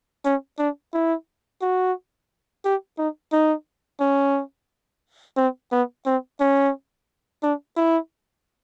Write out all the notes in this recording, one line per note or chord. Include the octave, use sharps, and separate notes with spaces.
C#4
D4
E4
F#4
G4
D#4
D#4
C#4
C4
B3
C4
C#4
D4
E4